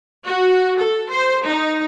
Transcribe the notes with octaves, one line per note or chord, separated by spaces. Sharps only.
F#4
A4
C5
D#4